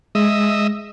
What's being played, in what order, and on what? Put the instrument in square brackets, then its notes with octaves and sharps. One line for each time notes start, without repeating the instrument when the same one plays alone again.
[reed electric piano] G#3 [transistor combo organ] D#5 E5